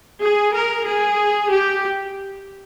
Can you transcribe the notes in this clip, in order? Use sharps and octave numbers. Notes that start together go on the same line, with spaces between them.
G#4
A#4
G#4
G4